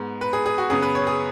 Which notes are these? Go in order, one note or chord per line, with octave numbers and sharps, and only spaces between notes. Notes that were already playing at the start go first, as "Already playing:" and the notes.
Already playing: G#2 G#3 B3
B4
G#4
G#4
F#4
F#2 C#3 B3 G#4
B4
C#5
G#4